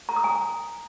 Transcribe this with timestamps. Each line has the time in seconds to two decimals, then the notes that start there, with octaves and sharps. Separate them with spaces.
0.09 A#5
0.16 D#6
0.24 G#5